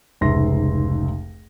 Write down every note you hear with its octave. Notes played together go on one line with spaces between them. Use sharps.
F1 C#2 G#2 E5 C6 A#6